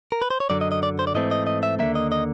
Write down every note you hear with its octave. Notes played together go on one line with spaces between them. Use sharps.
A#4
B4
C5
C#5
F#2 D3 F#3 D5
D#5
D#5
D5
C5
D5
G#2 E3 A3 C4 D#5
D#5
D#5
E5
D#2 D3 F3 A#3 E5
D#5
D#5